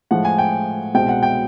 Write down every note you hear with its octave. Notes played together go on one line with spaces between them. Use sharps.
A2 F3 G#3 F#5
G#5
G5
C2 B2 G#3 C4 G5
F#5
G5